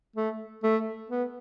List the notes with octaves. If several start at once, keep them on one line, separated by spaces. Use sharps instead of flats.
A3
A3
B3